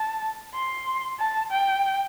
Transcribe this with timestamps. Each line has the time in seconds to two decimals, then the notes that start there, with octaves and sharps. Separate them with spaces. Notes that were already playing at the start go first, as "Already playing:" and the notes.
Already playing: A5
0.54 C6
1.19 A5
1.52 G5